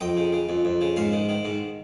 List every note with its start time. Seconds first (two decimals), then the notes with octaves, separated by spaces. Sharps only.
0.01 F2 D#5 G5
0.17 C#3
0.32 C#3
0.49 F2
0.65 F2
0.81 C#3
0.96 G#2 C#5 F5
1.12 D#3
1.29 D#3
1.45 G#2